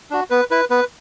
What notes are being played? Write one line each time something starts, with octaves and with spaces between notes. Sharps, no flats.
D4 F#4
B3 B4
E4 B4
B3 B4